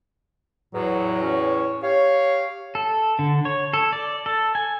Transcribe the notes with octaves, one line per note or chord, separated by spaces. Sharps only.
E2 A2 F#3
C#4
G4 C#5 F5
A4
D3
C#5
A4
D5
A4
G#5